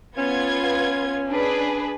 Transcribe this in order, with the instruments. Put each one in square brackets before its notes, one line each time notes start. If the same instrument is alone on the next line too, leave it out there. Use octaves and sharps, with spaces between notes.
[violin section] B3 F4 G#6 [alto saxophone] C#4
[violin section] D4 G#4 B4